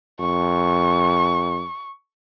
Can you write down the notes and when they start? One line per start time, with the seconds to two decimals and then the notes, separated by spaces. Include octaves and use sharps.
0.20 F2 C#6